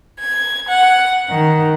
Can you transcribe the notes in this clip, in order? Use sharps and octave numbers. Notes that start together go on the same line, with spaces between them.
G#6
F#5
D#3